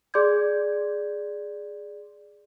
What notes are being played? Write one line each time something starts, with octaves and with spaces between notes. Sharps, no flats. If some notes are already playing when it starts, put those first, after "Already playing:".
G#4 D5 C6 D6 G6 G#6